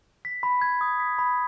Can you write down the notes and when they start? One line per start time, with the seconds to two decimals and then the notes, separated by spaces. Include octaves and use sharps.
0.25 B6
0.43 B5
0.62 G#6
0.81 D#6
1.00 B6
1.19 B5